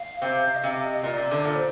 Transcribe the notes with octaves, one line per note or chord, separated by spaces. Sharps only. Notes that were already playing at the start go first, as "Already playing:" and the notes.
Already playing: F5
C3 C4
D#5
C3 F5
F5
D#5
D#5
A#2 D5
C3
D3
A#2 D5
C5